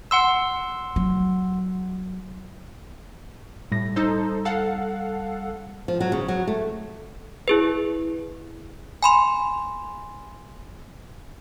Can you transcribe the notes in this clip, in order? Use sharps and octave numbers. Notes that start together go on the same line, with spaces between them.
F#5 C6 E6
F#3
A2 G3 A#6
D#4 A4 C5
A4 F5 F#5
F3
F#3
C#3
F#3
A3
E4 G#4 B4
G#5 B5 C6